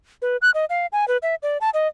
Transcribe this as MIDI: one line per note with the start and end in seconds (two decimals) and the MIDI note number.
0.22 0.37 71
0.42 0.50 90
0.54 0.65 75
0.70 0.86 77
0.92 1.07 80
1.08 1.17 71
1.22 1.35 76
1.43 1.58 74
1.61 1.70 81
1.74 1.87 75